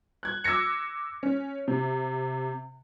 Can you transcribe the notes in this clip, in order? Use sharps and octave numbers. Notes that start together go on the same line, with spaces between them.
F#6 G#6
D6 E6 G#6 A#6 C#7
C#4
C3